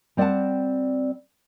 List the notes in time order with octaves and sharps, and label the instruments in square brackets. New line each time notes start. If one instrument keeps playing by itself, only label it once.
[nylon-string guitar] G3 C4 D5 E5 F#5 A5